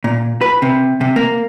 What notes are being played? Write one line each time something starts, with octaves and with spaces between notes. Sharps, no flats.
A#2
B4
C3
C3
A#3